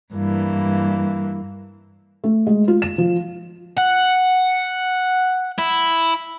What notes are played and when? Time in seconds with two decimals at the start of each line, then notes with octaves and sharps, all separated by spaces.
0.14 G2 E3 A#3
2.24 A3
2.47 G#3
2.68 F4
2.82 E7
2.98 F3
3.78 F#5
5.58 E4